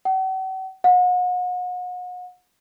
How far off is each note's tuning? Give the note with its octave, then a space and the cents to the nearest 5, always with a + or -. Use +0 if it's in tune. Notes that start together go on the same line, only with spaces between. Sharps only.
F#5 +45
F#5 -40